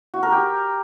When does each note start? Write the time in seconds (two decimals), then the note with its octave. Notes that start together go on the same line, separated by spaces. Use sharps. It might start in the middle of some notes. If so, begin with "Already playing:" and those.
0.14 F#4
0.23 A#4
0.32 G4